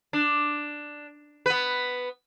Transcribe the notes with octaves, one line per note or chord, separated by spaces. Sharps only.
D4
B3 B4